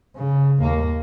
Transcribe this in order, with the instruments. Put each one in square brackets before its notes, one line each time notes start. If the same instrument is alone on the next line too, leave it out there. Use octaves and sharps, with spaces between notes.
[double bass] C#3
D#2 A#3